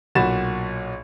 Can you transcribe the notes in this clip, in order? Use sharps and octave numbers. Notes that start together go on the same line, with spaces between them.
B1 A#2 F#4 B5 A6 E7